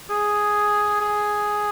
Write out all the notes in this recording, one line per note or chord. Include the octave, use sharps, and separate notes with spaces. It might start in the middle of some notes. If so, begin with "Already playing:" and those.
G#4
G#4